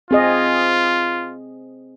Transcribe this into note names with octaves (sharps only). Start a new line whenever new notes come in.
C4 F4 G#4 D#5